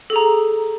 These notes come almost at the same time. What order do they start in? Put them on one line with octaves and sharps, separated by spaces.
A4 G#4 A#5